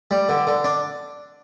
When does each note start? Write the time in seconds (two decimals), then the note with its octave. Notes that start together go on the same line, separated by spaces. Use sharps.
0.11 G3
0.29 D3
0.47 D3
0.64 D4